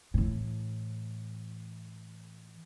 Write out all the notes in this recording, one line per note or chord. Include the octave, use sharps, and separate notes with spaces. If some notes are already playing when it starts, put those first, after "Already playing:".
A2 E3